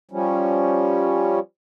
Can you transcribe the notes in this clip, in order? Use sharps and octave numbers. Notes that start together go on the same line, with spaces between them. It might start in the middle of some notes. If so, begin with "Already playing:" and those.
F3 G3 C#4